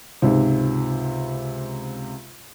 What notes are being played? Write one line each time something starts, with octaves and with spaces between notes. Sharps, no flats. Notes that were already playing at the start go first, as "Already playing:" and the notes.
C#2 G#2 C3